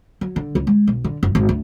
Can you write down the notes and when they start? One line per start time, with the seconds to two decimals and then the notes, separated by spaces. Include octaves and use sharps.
0.21 F#3
0.36 D3
0.55 C#2
0.67 G#3
0.87 B1
1.04 D3
1.23 F#1
1.35 G#1
1.49 D2